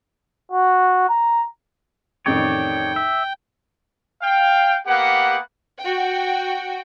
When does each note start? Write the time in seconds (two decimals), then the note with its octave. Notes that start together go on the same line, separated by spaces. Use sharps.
0.51 F#4
1.09 A#5
2.26 A1 F2 D#3 C#5 D5 G5
2.96 E5
4.22 F5 G5
4.86 A#3 B3 G4 F#5
5.80 F#4 G5